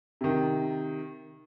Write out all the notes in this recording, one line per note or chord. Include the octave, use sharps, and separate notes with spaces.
C3 D#3